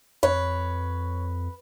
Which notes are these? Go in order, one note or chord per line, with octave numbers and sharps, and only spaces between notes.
F2 B4 C#5